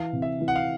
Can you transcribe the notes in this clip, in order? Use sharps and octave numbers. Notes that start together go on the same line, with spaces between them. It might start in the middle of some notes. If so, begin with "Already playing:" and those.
Already playing: E3 F5
C3
E5
E3
F#5
F5